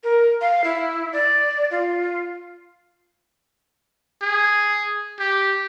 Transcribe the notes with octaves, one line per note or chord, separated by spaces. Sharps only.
A#4
F5
E4
D5
F4
G#4
G4